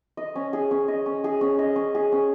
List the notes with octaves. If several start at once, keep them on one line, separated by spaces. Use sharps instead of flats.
D#5
C#4
G#4
C#4
D#5
C#4
G#4
C#4
D#5
C#4
G#4
C#4